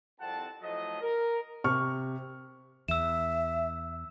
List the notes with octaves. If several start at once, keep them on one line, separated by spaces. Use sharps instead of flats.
C2 F2 C4 F#5 A5
A2 F3 F#3 A3 D#5
A#4
C3 C#6 F6
E2 E5 E6 E7